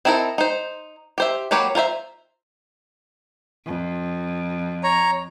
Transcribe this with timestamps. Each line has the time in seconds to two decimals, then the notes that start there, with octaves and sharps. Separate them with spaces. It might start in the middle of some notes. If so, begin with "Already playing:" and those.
0.05 C4 D#4 E4 A4 A#4
0.38 D#4 C5
1.18 G4 C5 E5
1.51 F#3 A#3 G4 B4 C#5
1.75 F4 A#4 C5 E5
3.66 F2
4.84 C#5 A#5